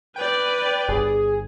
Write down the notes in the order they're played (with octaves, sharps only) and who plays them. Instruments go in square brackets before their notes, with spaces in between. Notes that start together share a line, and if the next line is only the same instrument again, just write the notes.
[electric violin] B4 D5 [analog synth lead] G5
[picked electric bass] G1 [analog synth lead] G#4